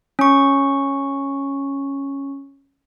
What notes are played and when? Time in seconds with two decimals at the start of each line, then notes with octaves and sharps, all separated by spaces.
0.19 C#4 C#6